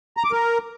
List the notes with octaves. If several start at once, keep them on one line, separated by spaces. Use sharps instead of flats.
A#5
D6
A#4